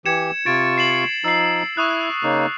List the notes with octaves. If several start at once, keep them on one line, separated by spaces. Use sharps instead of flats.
E3 G4 G#6 C#7 E7
C3 F4 C#6 A6 D7
C7 E7 F#7
F3 D#4 E6 C7
E4 C#6 D#6 F#6
C#3 A#3 D#4